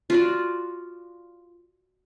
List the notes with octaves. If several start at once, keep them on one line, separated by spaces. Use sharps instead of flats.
F4 F#4 D5